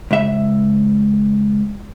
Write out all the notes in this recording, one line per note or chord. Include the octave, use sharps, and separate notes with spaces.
C#2 E5